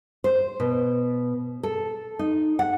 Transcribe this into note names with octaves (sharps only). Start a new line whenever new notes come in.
C5
B2
A4
D#4
F#5